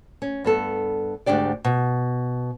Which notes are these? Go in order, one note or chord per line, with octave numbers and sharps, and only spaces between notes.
C#4
G2 B3 A4
D2 G#2 D4 G4 D5
B2